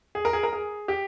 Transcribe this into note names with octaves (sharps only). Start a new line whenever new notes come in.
G#4
A#4
G#4
A#4
G#4
G4